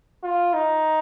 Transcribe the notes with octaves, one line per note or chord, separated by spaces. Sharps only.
F4
D#4